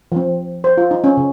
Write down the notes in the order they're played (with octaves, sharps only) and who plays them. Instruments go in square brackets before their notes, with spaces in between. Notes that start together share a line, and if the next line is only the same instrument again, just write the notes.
[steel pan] F3 C4
C5
F4
D#4
C#4
C#3